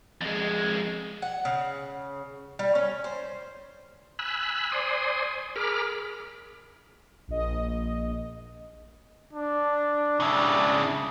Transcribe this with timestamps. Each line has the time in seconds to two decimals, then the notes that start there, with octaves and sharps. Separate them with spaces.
0.21 F2 G#3
1.22 F#5
1.45 C#3
2.59 G3
2.75 C#4
3.04 C5
4.19 G#5 B5 E6 F#6
4.72 C5 D5 G#5 C6 D#6
5.56 G#4 A#4 B5 D6 F6
7.28 A#1 D#5
9.33 D4
10.20 C#3 D4 E4